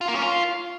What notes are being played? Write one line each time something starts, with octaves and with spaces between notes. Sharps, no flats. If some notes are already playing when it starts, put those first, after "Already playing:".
F4
A#3
C#4
F4